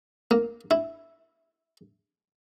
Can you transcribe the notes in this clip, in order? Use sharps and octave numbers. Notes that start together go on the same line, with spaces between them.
A#3
E4